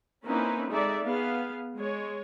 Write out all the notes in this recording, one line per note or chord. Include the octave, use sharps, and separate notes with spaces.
A#3 C4 C#4 D#4 E4 B4
G#3 D#4 A4 D5 E5
B3 G#4 F5
G#3 C#5